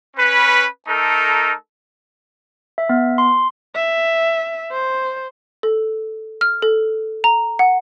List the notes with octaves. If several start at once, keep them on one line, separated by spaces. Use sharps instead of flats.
C#4 B4
A3 D#4 A4 A#4
E5
B3
C6
E5
C5
A4
F6
A4
A#5
F#5